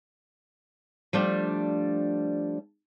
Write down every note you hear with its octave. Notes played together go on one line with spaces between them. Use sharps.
F3 G3 A3 D4